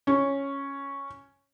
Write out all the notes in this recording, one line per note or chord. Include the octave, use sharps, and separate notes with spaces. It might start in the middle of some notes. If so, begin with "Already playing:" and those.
C#4